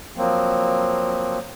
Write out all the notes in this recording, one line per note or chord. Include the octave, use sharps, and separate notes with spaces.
F3 F#3 A#3 C4